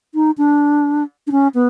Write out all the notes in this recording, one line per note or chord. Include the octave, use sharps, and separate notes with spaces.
D#4
D4
D4
C#4
B3